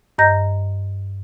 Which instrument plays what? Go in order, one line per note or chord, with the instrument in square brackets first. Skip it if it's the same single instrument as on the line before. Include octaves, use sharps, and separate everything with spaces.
[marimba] G2 D#5 A#5 G6 A#6